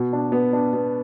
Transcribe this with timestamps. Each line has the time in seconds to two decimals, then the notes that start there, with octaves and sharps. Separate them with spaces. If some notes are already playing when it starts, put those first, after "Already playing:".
Already playing: B2
0.13 D4
0.32 B3
0.53 D4
0.73 B3